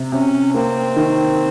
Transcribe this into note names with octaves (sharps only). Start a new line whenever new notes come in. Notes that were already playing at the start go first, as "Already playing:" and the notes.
Already playing: C3
C3 C#4
A#3 C4
D#3